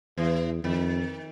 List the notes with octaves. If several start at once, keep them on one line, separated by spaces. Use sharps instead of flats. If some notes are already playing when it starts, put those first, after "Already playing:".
E2 E3
F2 D#3